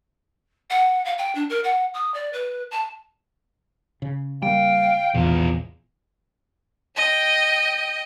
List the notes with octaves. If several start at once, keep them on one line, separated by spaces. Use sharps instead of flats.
F#5
F5
G5
D4
A#4
F#5
D#6
D5
B4
A5
C#3
G3 A#3 F5 G5
E1 A#1 E2 C3 F4
D#5 G5